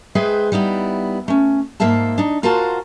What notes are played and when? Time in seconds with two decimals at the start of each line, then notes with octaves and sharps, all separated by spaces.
0.15 G#3 G#4 B4 C5 E5 G5
0.52 G3 B3 D#4 E4
1.28 A3 C#4
1.80 G#2 A#3 C5 E5 A5
2.18 D4 D#4
2.43 F4 F#4 A#4 C5 F#5 A5